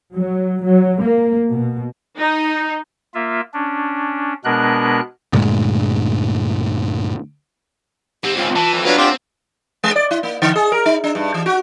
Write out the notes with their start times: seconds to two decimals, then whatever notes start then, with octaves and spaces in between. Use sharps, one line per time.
0.14 F#3
0.64 F#3
1.00 A#3
1.51 B2
2.18 D#4
3.14 A#3 F4 E5
3.53 C#4 D4
4.44 B2 G#3 B3 D4 A#4 F#6
5.33 D2 G2 A#2 G#3
8.24 G#2 C4 G4
8.37 C#2 F4
8.56 E3 A5
8.73 F2
8.85 F#3 B3 D4 B4 F5
8.98 C4 F4 G4 F#5
9.84 G#3
9.96 D5
10.11 E4
10.23 A#3
10.42 D3
10.56 G#4
10.72 A#4
10.86 D#4
11.04 D4
11.15 G2
11.34 E3
11.46 F#4